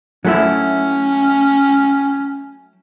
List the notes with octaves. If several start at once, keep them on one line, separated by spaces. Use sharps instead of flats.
F#3 A3 C#4 E4